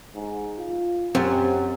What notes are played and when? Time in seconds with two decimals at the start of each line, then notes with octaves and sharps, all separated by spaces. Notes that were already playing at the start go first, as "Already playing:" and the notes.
0.15 G#2
0.58 F4
1.15 F#2 C4 G4